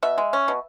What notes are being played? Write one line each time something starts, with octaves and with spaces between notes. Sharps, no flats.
B2 E5
G#3
C#4
B2